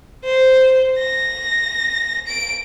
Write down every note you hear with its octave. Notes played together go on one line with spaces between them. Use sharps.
C5
A#6
D7